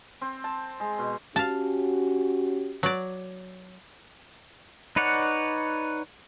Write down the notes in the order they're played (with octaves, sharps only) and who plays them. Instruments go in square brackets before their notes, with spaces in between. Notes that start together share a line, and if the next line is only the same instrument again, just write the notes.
[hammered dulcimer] C4
A5
G#3
B2
[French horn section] C#4 F#4 G4 [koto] F5 A5
[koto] F#3 D5
[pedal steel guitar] D#4 B4 C#5 D5 F#5